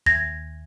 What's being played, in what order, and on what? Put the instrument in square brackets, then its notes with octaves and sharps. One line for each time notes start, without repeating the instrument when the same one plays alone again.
[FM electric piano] D#2 [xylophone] G#6 A#6